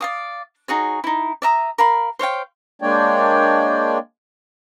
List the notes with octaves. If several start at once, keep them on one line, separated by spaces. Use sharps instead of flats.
D5 F5 D#6
D#4 F#4 G#4 C#5
D#4 E4
D5 E5 A#5 D#6
A#4 F5 B5
C5 C#5 F5 G5
G#3 A#3 D4 C#5 D5 G5